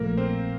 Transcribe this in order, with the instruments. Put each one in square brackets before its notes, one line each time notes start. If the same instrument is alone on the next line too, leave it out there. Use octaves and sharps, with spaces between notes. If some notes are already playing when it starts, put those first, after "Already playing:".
Already playing: [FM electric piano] A#1 A#2 F3 A3 [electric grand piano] A#3 A#4
[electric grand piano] C4 C5